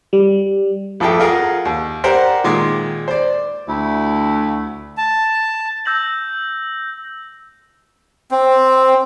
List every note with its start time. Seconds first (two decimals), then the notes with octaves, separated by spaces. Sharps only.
0.13 G3
1.00 A1 F2 G#4 A4 E5 G5
1.20 F4 G#4 A#4 F#5 A#5
1.65 D#2
2.04 G4 A#4 C5 D5 F#5 A#5
2.44 A#2 D#3 G#3 C6 D6
3.08 C5 D5
3.69 D2 E4
4.97 A5
5.86 E6 G6 A#6 F#7
8.31 C4